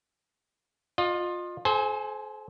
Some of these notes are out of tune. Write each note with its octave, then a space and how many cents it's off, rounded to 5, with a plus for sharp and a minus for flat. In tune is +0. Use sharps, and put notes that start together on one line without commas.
F4 +20 D#5 -25
A4 -45 C5 +0 G#5 +0